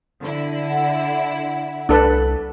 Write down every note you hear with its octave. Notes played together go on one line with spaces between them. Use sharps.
D3 E4
F#5
C2 D4 A4 B4